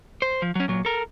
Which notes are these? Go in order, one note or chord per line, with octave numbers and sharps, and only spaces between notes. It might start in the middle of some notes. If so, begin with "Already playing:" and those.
C5
F3
F#3 C#4
A#2 F#3
A4 A#4